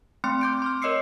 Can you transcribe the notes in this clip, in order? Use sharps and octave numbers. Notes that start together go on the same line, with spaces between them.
A3 C4 G5 C6 F6 C#7
D6 G6 D7
C6 D6 F6
A#4 C#5 D#5 E6 C7 C#7